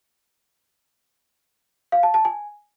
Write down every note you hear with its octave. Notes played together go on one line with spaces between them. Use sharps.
F5
A5
A5
G#5